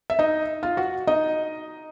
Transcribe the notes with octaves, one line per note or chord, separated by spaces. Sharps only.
E5
D#4 D#5
F4 F5
F#4 F#5
D#4 D#5